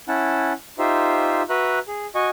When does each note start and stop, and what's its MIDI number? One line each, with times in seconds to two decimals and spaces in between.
0.08 0.53 61
0.08 0.53 64
0.08 0.53 78
0.08 0.53 81
0.79 1.42 63
0.79 1.42 65
0.79 1.42 67
0.79 1.42 72
0.79 1.42 76
1.50 1.79 66
1.50 1.79 71
1.50 1.79 76
1.50 1.79 82
1.50 1.79 90
1.87 2.07 68
2.15 2.30 66
2.15 2.30 75
2.15 2.30 80
2.15 2.30 85